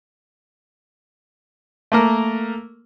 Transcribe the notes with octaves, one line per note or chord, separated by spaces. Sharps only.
A3 A#3 A#4